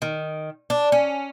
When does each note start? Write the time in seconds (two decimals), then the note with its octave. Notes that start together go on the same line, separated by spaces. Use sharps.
0.02 D#3
0.70 D4
0.92 C#4